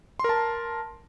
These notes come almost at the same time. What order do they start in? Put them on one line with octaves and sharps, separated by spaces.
C6 A#4 A5